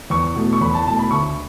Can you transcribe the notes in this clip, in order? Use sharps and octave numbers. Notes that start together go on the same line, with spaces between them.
E2 C#6
B2 A3
C#6
E2 B5
A5
B2 A3 A5
B5
D2 C#6